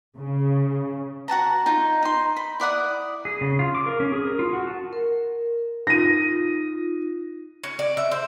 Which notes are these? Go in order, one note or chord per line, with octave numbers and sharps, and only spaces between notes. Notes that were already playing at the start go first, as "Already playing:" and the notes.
C#3
F#4 F#5 A5 A#5
D#4 F4
D#4 C6
B5
E4 D5 F#5 D#6
G#4
C#3
F4
D6
A#4
C#4
G#4
A#4
F4
F#4
A5
A#4
D#4 F4 A#6 D#7
C#4
D5
E5
C5